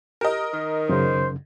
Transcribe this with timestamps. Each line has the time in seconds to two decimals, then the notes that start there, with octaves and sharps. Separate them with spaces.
0.21 G4 A#4 D#5
0.53 D#3
0.89 F#2 C#3 C5